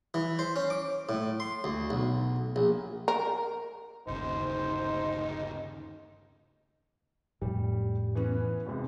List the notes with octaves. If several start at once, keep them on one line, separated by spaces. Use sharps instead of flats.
E3
C5
C#4
D6
A2
C6
D2
B1
A#1
A#4
G1 D#2 C#3 D#4 C5
F2 A2 F#3 G3
E3 B3 C#4
G#1 E2 C3